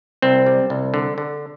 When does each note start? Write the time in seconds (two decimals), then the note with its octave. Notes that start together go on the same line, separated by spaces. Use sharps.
0.22 C2 C4
0.46 G3
0.70 C2
0.94 D3
1.18 D3